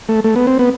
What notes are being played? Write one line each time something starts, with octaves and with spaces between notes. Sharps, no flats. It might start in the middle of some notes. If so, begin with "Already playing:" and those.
A3
A3
B3
C4
B3